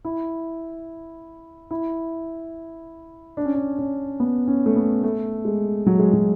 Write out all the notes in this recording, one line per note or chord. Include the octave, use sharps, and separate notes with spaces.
E4
E4
D4
C#4
D4
C#4
B3
C#4
A3
B3
A3
G#3
F#3
G#3
F#3